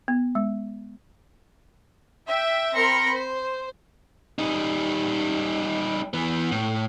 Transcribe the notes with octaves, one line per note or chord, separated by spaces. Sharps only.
B3
G#3
E5 G5
C4 A#4 B5 C6 A#6 C#7
C5
G3 D#4
E3 B3
A2